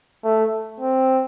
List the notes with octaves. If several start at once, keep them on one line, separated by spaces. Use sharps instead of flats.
A3
C4